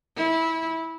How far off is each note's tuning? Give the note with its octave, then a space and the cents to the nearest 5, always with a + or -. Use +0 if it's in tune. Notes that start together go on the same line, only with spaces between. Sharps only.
E4 -20